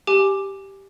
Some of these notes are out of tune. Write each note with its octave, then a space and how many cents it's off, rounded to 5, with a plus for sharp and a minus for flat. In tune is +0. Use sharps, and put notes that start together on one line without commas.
G4 +0 G#5 +10 D6 +5